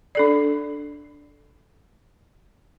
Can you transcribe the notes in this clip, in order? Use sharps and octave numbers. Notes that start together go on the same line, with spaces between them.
D4 A4 D5